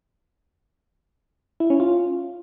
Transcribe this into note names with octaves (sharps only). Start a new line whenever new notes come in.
E4
C#4
F4